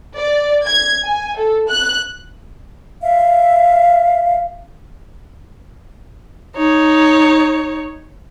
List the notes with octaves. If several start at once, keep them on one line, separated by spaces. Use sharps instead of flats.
D5
G#6
G#5
A4
F#6
E5 F5
D#4 C#5